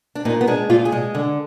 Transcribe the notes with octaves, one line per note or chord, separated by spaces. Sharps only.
D4
A#2 D#4
B3
G#3 D4
A#2 F4
G#4
G#3
D3